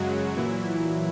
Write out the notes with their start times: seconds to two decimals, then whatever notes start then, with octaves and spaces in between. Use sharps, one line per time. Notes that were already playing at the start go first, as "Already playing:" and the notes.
Already playing: F#2 C#3 F#3 G#3 F#4
0.36 A#2 E3 F#3 E4